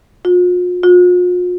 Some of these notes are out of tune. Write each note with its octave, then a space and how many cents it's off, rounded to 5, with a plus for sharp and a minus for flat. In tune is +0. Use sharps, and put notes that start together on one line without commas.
F4 +45
F4 +45